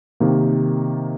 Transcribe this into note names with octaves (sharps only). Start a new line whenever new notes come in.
C3 D#3 A#3